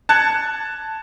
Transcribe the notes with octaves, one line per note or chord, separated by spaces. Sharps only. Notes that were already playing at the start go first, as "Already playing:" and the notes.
A5 F#6 G#6 C#7